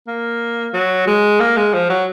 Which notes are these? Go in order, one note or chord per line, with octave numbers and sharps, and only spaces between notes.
A#3
F#3
G#3
A#3
G#3
F3
F#3